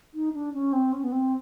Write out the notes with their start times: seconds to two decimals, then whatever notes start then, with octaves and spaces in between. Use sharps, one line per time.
0.14 D#4
0.33 D4
0.53 C#4
0.73 C4
0.92 C#4
1.04 B3
1.12 C4